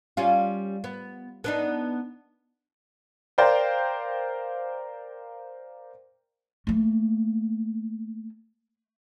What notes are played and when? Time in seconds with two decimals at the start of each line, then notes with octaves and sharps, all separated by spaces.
0.17 G3 C#4 F4
0.84 B3
1.44 B3 D4 D#4
3.38 A#4 C5 D5 F5 G5
6.67 A3 A#3